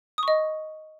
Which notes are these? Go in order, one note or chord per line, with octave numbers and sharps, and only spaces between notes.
D#5 C#6 D#6